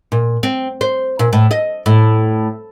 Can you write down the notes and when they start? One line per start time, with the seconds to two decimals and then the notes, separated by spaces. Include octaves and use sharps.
0.12 A#2
0.43 C4
0.81 C5
1.19 A#2
1.33 A2
1.51 D#5
1.86 A2